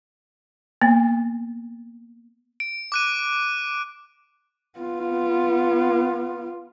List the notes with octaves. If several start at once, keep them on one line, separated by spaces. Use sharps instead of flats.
A#3 B3
D7
D6 F#6 D#7
B3 F4